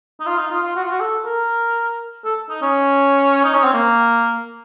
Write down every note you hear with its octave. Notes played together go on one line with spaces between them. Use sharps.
D#4
F4
D#4
F4
F4
F#4
F4
F#4
A4
A#4
A4
D#4
C#4
D#4
C#4
C4
A#3